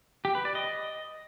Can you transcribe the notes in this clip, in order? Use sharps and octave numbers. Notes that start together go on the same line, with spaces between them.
G4
B4
D5
D#5